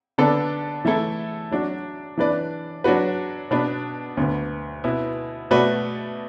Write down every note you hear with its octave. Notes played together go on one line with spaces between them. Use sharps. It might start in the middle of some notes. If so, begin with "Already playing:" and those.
D3 B3 D4 A4 D5
E3 A3 E4 A4
F#3 D4 F#4
E3 D4 B4 D5
F#3 D4 F#4 B4
B2 B3 D4 B4
D2 D3 B3
B2 B3 E4
B2 A3 F#4 B4 D5